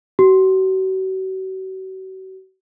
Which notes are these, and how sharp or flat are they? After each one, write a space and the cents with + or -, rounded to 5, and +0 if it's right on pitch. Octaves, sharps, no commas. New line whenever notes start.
F#4 +40